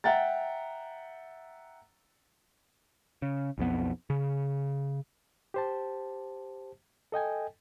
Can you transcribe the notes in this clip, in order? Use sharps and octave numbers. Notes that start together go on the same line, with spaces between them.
E5 F#5 G5 A#5 A6
C#3
B1 F2 B3
C#3
G4 C5 A5
A4 D#5 G5 G#5